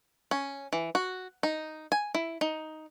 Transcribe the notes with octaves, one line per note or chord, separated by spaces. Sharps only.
C#4
E3
F#4
D#4
G#5
E4
D#4